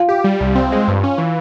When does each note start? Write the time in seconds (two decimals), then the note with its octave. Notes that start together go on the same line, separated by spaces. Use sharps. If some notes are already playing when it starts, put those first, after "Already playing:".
Already playing: F4
0.09 G4
0.24 G3
0.40 C2
0.55 C4
0.72 G#3
0.88 G2
1.03 C#4
1.18 E3